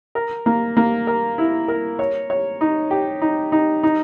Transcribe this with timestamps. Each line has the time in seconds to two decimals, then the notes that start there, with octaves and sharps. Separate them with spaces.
0.15 A#4
0.46 A#3
0.77 A#3
1.07 A#4
1.38 E4
1.68 A#4
1.99 C#5
2.30 C#5
2.61 D#4
2.91 G4
3.22 D#4
3.52 D#4
3.83 D#4